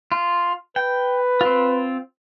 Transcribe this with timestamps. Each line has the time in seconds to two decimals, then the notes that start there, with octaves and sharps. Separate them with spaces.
0.12 F4
0.76 B4 G5
1.41 C4 F4